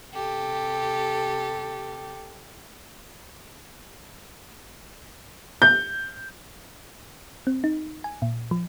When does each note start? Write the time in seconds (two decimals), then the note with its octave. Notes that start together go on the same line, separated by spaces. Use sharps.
0.11 C3 G4 A4
5.62 G6
7.47 C4
7.64 D#4
8.04 G#5
8.22 A#2
8.51 F3